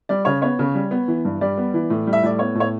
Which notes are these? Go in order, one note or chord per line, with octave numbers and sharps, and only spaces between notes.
G3 D5
C#3 C#5
B3 C#5
C#3
G3
B3
E3
G2
G3 D5
B3
E3
A2
G3
E5
A2 D5
B3 C#5
A2
C#5